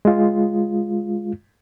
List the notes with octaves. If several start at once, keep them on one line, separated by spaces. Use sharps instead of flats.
G#3 F4